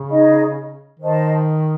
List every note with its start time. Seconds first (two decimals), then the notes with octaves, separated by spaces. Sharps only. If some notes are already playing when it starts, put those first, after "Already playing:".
Already playing: C#3
0.10 D#4 G#4 D#5
1.00 D#3 C5 D#5 A5